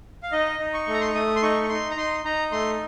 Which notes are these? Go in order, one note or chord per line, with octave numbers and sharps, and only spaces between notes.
F5
D#4 D#5
D#4
C#6
A3
A#5
C6
C#6
A3 D#6
C6
D#4 C#6
C#6
D#4 C6
A#5
D#4 C6
D#4 A#5
A3 C6